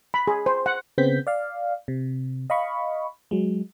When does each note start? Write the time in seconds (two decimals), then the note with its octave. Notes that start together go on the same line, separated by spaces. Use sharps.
0.14 B5
0.27 G#4
0.46 C5
0.66 F#5
0.98 C#3 B3 C4 G6 B6
1.27 D5 F5
1.88 C3
2.50 D#5 F5 B5 C#6
3.31 F#3 G#3